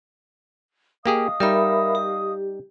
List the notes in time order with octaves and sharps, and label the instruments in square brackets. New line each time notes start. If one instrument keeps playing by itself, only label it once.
[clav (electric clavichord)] A#3 G4 G#4 [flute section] D#5 F5 D#6
[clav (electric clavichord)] G3 D#4 [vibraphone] A#4 E5 B5
[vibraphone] G4